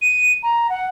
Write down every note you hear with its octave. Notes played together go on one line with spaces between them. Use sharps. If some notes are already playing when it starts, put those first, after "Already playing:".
D#7
A#5
F#5